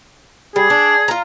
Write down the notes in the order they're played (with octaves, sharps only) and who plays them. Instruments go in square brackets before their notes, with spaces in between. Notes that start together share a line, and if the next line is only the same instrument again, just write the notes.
[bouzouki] G3 [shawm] G#4
[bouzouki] D4
F4 A#5